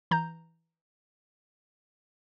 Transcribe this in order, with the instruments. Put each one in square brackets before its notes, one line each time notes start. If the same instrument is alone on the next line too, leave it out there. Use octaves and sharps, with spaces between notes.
[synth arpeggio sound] E3 A#5 G6